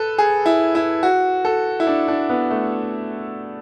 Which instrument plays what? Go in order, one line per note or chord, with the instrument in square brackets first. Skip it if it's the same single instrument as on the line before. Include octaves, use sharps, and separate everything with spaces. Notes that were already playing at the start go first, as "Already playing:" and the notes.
Already playing: [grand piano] A4 B4
G#4
E4
E4
F#4
A4
E4
D4
D4
B3
A3